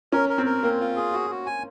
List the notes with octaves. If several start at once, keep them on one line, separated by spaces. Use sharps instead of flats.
C#4 A#4
A#4
C4
A#4
A#3 C4
F4
G#4
F#4
F#4
G#5